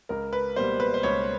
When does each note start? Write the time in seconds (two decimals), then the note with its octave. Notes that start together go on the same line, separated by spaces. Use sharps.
0.09 C#2 A#4
0.33 B4
0.56 B2 G3 A#3 C5
0.80 B4
0.94 C5
1.03 C#2 C#5